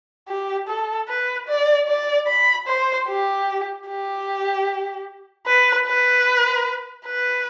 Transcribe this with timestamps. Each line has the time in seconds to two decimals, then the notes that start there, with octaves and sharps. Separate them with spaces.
0.28 G4
0.67 A4
1.08 B4
1.47 D5
1.87 D5
2.27 B5
2.67 C5
3.08 G4
3.87 G4
5.46 B4
5.87 B4
7.05 B4